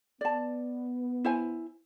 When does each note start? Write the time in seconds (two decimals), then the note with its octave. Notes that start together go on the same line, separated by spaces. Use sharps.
0.21 B3 D5 A5
1.25 E4 C5 G#5